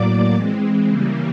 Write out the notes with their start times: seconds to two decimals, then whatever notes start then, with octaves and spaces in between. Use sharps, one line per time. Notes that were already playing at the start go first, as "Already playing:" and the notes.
Already playing: A2 F#3 A#3 D5 D6
0.33 E3 G#3 C4
0.89 C#3 E3 G3 A#3